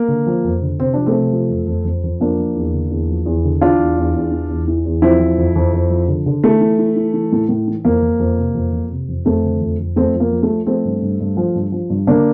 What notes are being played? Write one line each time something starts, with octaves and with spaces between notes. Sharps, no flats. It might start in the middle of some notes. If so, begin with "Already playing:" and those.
Already playing: A#3
D3
F3
F2
D3
C3 C4
F3 D4
A3 C4
C3
F3
F2
F2
F2
F2
F3 A#3 D4
F3
E2
D3
E2
F3
E2
D3
E3 D4 F4
E2
E2
E2
E3
E2
E3
E2
F3 C4 E4
F3
F2
F2
F2
F3
D3
D3
E3 A3
E3
E3
E3
E3
A2
A2
E3
F2 A#3
F2
F2
C3
F2
F2
C3
F2
F2 A3 C4
D3
F2
F2
F2 A3 C4
F3
A#3
F3
A3
F3
F3 A3 C4
G2
G2
G2
F3
G2
F3
G2
D3 A#3 D4